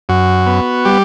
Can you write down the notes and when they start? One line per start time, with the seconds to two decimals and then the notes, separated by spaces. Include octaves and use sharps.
0.09 F#2 F#4
0.46 B3
0.85 G3 G4